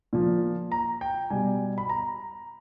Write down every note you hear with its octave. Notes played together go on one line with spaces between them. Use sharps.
A#2 F3
A#5
G5
B2 G3 G#5
B5
A#5